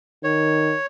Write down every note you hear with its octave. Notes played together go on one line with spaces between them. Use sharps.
D#3 C#5